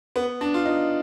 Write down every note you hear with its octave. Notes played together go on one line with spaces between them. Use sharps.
B3
D4
F4
D#4